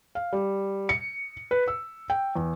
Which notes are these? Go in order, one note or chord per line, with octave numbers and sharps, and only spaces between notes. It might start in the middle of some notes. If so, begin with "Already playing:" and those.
F5
G3
C#7
B4
E6
G5
E2